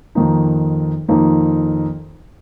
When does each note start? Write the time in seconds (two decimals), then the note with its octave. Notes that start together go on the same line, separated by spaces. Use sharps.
0.15 F2 D#3 A#3 D#4
1.08 F2 D#3 A#3 D#4